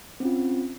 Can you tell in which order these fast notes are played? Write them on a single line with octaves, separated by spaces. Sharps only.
C4 C#4 F4